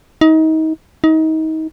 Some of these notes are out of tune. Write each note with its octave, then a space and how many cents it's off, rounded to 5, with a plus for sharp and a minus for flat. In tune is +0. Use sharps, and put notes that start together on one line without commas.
D#4 +30
D#4 +30